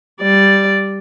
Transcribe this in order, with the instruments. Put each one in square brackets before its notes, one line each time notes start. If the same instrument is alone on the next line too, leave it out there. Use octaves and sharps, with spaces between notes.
[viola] G3 D5